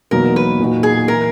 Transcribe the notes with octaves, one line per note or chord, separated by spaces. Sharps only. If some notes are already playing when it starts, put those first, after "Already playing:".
E2 B2 F#3 A#3 D#4 A#4
B4
A#2 A#3 D#4 F#4
G#4
E3 A#4